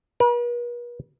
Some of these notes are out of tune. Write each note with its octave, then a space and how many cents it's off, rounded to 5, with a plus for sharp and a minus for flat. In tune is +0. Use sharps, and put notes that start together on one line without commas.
B4 -45